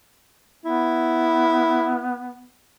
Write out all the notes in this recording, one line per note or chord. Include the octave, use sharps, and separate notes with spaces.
B3 E4